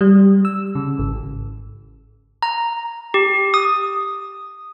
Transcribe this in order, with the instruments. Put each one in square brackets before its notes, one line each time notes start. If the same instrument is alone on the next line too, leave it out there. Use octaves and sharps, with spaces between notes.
[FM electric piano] G3
E6
C#3
G#1
[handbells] A#5
G4
D#6